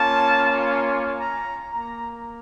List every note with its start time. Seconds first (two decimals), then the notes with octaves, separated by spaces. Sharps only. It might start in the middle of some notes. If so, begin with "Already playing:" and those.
Already playing: A#3 C#4 F4 A5
1.18 A#5
1.72 A#3 A#5